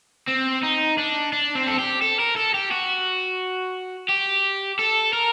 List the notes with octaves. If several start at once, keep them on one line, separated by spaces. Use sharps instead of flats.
C4
D#4
D4
D4
C4
A4
G4
A4
A#4
A4
G4
F#4
G4
A4
A#4